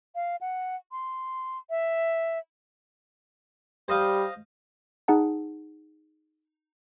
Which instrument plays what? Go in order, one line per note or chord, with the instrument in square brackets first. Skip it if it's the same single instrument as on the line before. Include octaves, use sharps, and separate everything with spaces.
[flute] F5
F#5
C6
E5
[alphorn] G3 [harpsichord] C5 D#5 F5
[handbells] D#4 G#4 F#5 A5